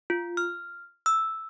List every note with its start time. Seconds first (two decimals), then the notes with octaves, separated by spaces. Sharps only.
0.10 F4
0.37 F6
1.06 E6